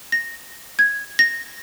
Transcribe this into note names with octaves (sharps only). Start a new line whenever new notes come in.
A#6
G#6
A#6